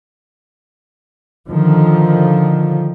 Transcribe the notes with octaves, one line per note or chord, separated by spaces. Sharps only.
D3 D#3 F3